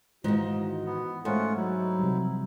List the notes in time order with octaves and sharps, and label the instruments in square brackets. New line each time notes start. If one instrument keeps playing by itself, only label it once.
[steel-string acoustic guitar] G#2 D#3 [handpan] E3 F4 C5 [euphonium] F#4 [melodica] D#5
[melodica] B3
[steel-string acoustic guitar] G#2 [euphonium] A3 [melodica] C#4 F4 F#5 [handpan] A4 C#5
[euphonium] F#3 [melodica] D#4 E4
[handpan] C3 F3 G3